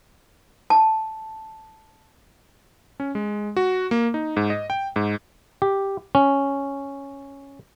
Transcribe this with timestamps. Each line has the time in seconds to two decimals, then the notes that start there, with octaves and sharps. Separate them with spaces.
0.70 A5
3.00 C#4
3.15 G#3
3.57 F#4
3.91 A#3
4.14 D#4
4.37 G#2
4.50 D#5
4.70 G5
4.96 G#2
5.62 G4
6.15 C#4